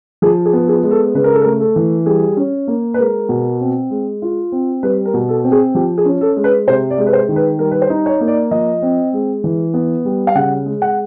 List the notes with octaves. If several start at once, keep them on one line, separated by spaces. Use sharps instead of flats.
F3 G#4
G#4
B3
G#4
G#3
A4
C#3 B4
A#4
A4
A#4
A3
A4
E3
G3 G#4
C#4
A#3
B4
G#3 A#4
B2
C4
G#3
F4
C4
G3 B4
A#4
B2
A4
C4
G#4
F3 G4
G#4
C#4
A4
G#3
B4
C3 C5
D5
G#3
B4
C5
D#3
B4
G3 A#4
B4
C5
D#4
C#5
A#3
D5
F3 D#5
C4
G#3
E3
B3
G3
F5
C#3 F#5
G#3
F#5